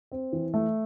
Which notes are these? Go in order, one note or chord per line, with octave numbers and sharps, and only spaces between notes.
C4
E3
A3